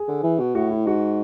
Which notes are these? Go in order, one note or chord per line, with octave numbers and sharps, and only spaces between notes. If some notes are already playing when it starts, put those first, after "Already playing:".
Already playing: G#4
D3
E3
B2
A2 F#4
E4
G#2 F#4